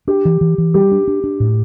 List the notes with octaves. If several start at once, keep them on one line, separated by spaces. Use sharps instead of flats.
D4 G4
E3
E3
E3
G3 G4
D4
D4
D4
A2